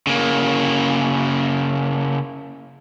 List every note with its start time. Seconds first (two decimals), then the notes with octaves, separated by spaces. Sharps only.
0.07 C#3 A#3